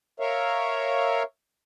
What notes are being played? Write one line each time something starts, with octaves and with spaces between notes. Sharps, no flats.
A#4 C#5 E5 F5